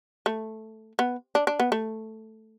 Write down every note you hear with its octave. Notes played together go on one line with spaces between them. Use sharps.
A3
B3
D4
D4
B3
A3